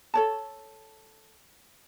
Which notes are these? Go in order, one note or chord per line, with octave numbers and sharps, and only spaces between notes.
A4 C#5 A5